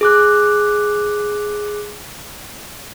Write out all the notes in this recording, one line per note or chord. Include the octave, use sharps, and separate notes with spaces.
G#4 D6 F#6